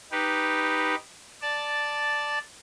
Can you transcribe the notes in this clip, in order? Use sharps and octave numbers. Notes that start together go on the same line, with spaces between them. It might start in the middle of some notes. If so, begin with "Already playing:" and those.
D#4 G4 B4
D5 A5